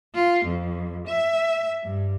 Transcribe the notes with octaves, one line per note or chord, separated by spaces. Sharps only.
F4
F2
E5
G2